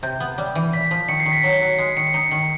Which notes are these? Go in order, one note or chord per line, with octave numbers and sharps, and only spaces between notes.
C3 G6
B3
G3
E3
A#2 B6
F3
D#3 C#7
C7
D#3
B6
F#3 C7
F#3 C#7
G#3 C7
D#3 C#7
D#4 C#7
D#3 C#7